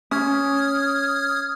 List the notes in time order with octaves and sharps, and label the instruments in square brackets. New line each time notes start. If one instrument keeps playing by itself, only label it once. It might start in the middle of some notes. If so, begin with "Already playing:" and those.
[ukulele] C#4 [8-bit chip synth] D#6 F6 G#6